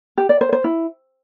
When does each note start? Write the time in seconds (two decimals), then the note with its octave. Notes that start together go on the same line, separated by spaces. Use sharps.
0.18 G4
0.29 D5
0.41 C5
0.53 C5
0.64 E4